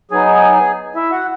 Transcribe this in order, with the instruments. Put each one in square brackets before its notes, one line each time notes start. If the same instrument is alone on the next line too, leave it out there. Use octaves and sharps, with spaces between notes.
[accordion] F#3 B3 D#4 G#4 G#5
E4 E5
F#4 F#5